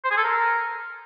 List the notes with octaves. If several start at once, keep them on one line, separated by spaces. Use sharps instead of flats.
C5
G#4
A4
A#4